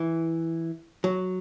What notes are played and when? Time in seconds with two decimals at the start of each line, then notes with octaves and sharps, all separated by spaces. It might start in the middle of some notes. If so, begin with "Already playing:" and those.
Already playing: E3
1.04 F#3